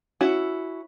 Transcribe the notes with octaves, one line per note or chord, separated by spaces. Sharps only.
C#4 E4 F#4